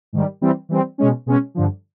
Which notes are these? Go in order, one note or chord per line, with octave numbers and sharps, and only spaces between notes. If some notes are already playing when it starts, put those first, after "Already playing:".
G#2 D#3 G3
E3 G3 C4
E3 G3 C4
B2 G#3 C#4
B2 G#3 C#4
G2 D3 F3